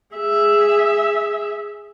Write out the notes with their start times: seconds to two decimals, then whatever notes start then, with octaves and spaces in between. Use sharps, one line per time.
0.16 G#4 E5